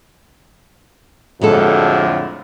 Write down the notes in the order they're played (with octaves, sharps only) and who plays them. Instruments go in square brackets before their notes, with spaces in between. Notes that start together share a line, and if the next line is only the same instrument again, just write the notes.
[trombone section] F2 A2 D3 [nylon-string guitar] F#3 G#3 A4